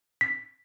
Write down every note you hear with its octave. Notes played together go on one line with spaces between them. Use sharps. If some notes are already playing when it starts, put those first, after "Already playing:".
B6